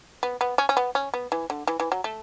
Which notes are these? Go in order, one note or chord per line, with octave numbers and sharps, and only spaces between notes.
B3
B3
C#4
C#4
B3
C#4
B3
E3
D3
E3
E3
F#3
A3